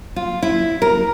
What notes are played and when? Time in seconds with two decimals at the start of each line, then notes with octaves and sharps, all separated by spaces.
0.16 F4
0.42 E4
0.82 A#4